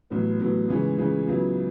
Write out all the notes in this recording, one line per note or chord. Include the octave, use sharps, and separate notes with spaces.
A1 A2 F#3 B3
A1 A2 F#3 B3
C#2 C#3 E3 G#3 C#4
C#2 C#3 E3 G#3 C#4
C#2 C#3 F#3 B3 E4